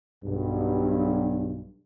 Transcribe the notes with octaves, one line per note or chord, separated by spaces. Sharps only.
B1 G2